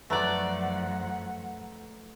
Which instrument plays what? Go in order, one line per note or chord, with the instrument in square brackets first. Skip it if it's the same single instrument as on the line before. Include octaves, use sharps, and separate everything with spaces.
[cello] F#2 F3 [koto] A3 D5 [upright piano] B4 A#5 F#6 [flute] F#5